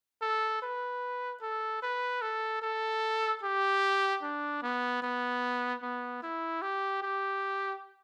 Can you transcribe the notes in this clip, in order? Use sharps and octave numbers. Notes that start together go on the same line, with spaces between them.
A4
B4
A4
B4
A4
A4
G4
D4
B3
B3
B3
E4
G4
G4